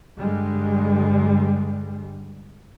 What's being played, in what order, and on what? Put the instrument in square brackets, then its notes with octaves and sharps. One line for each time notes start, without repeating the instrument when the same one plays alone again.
[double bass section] G2 D3 G3 G#3